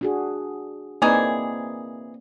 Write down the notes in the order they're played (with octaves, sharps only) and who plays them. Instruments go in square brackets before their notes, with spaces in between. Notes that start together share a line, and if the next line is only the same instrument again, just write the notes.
[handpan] D4 F#4 G#4
[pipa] E3 D#4 G#4 [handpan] A#3 C4 D5